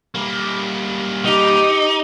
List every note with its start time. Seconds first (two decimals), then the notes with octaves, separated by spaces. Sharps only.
0.15 G3 A#3
1.25 D#4 G4